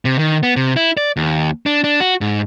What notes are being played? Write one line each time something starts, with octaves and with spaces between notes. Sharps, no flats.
C3
D#3
B3
C3
E4
D5
D#2
D4
D4
F#4
G#2